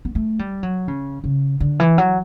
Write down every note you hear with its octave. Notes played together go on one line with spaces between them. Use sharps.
B3
A3
G3
F#3
C#3
C#3
D3
E3
F#3